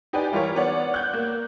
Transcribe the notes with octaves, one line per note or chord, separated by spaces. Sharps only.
D#4 G4 B4 D5 G5 G#5
E3 G3 F4 A#4 C#5
B3 C#5 D5 F#5
F#6 G6
A#3